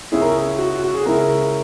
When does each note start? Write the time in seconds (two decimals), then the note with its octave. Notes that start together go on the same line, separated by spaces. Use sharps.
0.12 C#2 C#3 G#3 C#4 E4 G#4
0.21 A#4
0.33 G#4
0.59 F#4
0.84 F#4
0.94 G#4
1.06 C#2 C#3 G#3 C#4 E4 A#4